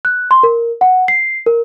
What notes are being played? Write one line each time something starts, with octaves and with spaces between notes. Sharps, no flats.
F#6
C6
A#4
F#5
C7
A#4